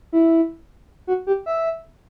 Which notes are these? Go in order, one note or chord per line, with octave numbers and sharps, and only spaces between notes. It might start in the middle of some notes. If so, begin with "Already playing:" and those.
E4
F#4
G4
E5